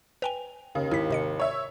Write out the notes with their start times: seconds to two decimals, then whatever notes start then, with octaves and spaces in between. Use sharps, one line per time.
0.22 B4 G5 G#5 F7
0.75 D#2 C#3
0.91 G#1 E4 B6
1.11 C3 D#5 C#7
1.40 C#5 E5